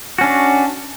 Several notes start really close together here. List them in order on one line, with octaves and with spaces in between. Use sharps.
F#4 C#4 D4